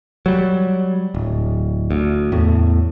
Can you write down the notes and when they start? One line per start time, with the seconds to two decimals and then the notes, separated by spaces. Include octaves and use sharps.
0.26 F#3 G3
1.15 D1
1.91 D2
2.32 E2 A2